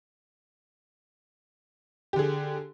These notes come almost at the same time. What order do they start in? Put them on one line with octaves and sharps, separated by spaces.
G4 D3 G#4